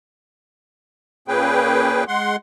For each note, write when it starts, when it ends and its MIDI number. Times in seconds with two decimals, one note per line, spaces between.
1.28 2.04 46
1.28 2.04 58
1.28 2.04 61
1.28 2.04 68
1.28 2.04 71
1.28 2.04 79
2.08 2.36 56
2.08 2.36 78
2.08 2.36 84